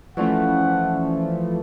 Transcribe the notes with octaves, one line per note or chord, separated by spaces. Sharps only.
E3 F3 A3 C#4 D5 F#5 C#6